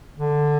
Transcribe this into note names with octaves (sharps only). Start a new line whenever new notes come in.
D3